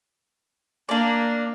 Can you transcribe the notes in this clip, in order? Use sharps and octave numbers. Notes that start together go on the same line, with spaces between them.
A#3 D4 D5